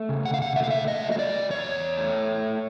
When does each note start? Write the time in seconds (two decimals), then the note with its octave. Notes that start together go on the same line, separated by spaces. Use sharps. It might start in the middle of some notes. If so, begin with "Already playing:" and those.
Already playing: A3
0.09 C#3
0.25 F#5
0.34 F5
0.42 F#5
0.56 A3 E5
0.64 F5
0.70 E5
0.88 D#5
1.03 F#3
1.12 D#5
1.19 D5
1.50 E2 C#5
1.97 A3